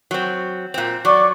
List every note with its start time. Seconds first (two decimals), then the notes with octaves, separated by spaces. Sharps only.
0.11 F#3 C4
0.74 A#2 C4
1.05 F#3 D5 C#6 D6